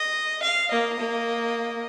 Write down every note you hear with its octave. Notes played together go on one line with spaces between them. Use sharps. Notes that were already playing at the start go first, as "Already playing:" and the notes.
Already playing: D#5
F5
A#3 D#5
A#3